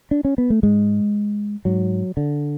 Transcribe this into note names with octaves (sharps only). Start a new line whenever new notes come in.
D4
C#4
B3
A3
G#2 G#3
G#2 F#3
D3